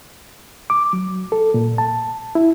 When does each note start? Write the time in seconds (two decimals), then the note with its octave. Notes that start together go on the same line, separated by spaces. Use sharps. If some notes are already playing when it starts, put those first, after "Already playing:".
0.70 D6
0.93 F#3
1.32 A4
1.54 A#2
1.78 A5
2.35 E4